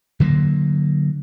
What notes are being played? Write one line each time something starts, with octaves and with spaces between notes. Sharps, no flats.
D3 F#3 G3 A#3